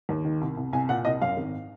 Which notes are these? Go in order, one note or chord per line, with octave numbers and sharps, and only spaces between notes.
D#2
D#3
C2
C2
C2 G#5
A#2 F#5
C2 D#5
F#2 F5
G#1